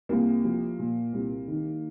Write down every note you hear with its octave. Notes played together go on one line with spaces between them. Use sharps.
C2 A#3
F3
A#2
C2
D#3